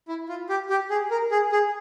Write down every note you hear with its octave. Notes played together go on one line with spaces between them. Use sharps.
E4
F4
G4
G4
G#4
A#4
G#4
G#4